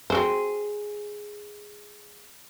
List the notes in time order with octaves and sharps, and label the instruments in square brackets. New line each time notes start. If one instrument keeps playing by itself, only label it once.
[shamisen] C4 F#4 C5 [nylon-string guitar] G#4